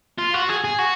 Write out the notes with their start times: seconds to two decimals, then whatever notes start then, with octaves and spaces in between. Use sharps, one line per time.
0.19 F4
0.34 F#4
0.49 G#4
0.64 G#4
0.79 F#4